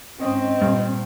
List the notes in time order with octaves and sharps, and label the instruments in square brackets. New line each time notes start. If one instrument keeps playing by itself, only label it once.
[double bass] G#2 C#4 [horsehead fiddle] C4 [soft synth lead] D#5
[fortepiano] G2 [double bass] A#2